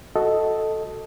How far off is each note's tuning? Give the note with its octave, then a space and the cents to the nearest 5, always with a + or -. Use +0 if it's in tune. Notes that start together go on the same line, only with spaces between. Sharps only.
F#4 +0 A4 +0 D#5 +5